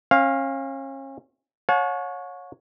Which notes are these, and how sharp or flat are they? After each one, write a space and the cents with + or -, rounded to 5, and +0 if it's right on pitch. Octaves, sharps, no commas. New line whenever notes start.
C#4 -35 F5 +0
C#5 +0 F#5 -45 A5 -45